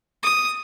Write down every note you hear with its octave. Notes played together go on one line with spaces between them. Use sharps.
D#6